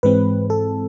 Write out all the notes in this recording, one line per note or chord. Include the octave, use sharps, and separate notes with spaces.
G#2 E3 G#3 C4 B4
A4